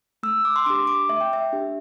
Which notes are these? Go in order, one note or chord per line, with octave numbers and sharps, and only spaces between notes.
A3 E6
D6
C6
D4 G4 D6
D6
A3 E5
G5
E5
D4 G4